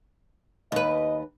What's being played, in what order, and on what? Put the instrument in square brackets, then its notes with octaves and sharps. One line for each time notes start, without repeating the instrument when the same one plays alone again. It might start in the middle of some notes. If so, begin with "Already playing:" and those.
[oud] D#2 B4 [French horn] D#5